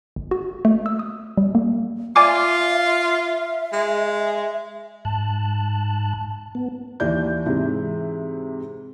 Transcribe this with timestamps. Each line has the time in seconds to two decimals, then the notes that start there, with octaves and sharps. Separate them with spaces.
0.16 G1
0.31 F#4
0.65 A3
0.86 E6
0.99 D#6
1.37 G3
1.55 A#3
2.16 F4 D5 E5 G#5 D6
3.72 G#3
5.05 G#2 A5 F#6
6.55 B3
7.00 D#2 E3 D5 G6
7.46 G#2 C3 E3